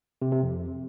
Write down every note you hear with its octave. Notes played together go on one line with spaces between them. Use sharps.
C3
C3
F2